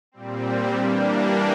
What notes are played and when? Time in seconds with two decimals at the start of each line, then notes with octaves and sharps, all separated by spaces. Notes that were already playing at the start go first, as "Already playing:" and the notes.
0.12 A#2 G3 C4
0.73 E3 G3 A#3 D4